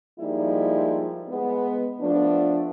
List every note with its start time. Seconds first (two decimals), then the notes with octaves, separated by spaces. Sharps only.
0.19 F3 G3 G#3 A#3 D#4 E4
1.28 G#3 B3
2.01 F3 A3 B3 D4